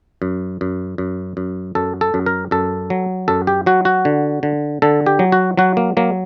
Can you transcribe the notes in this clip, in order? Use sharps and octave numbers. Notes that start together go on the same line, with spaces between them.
F#2
F#2
F#2
F#2
F#2 A4
A4
F#2
A#4
F#2 A4
F#3
F#2 A4
G4
F#3 F#4
F#4
D3
D3
D3 A4
G4
F#3
F#4
F#3 F#4
A#3
F#3 A#3